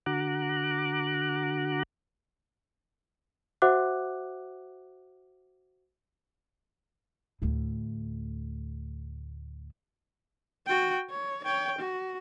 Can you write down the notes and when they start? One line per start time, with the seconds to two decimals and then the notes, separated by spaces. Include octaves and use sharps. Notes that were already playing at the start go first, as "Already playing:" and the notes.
0.06 D3 F#4 A#5 D6 F#6
3.62 F#4 C5 E5 F#5 D6 F#6
7.42 D2 A2
10.67 F#4 G5
11.10 C#5
11.44 C#5 G5
11.79 F#4